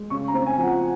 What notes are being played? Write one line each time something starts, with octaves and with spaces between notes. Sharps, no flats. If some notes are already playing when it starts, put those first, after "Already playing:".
Already playing: G#3
C#3 C#6
A#5
C4
G#5
F3 F#5